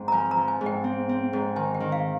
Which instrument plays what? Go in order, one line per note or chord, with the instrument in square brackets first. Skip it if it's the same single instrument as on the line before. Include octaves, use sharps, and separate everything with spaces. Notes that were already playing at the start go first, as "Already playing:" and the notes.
Already playing: [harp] G#2 C4
[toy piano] A#5
[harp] F3 [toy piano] G#5
[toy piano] A#5
[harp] F3
[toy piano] G#5
[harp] G#2
[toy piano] G5
[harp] C4
C4
G#2
[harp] D#3 [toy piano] G#5
[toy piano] G5
[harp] D#3
[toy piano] F5